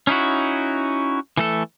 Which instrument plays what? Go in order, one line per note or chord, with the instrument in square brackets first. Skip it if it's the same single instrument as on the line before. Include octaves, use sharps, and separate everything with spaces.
[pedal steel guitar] C#4 D#4 E4 F#4
E3 A3 A4